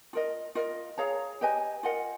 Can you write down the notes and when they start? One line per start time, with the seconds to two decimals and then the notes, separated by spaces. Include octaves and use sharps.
0.13 F4 A#4 D#5
0.55 F4 A#4 D#5
0.98 G#4 C#5 F5 A#5
1.41 G4 B4 D#5 G#5
1.83 F4 A#4 D#5 F#5